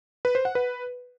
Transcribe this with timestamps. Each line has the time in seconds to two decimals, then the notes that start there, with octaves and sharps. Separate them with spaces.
0.25 B4
0.35 C5
0.45 F#5
0.55 B4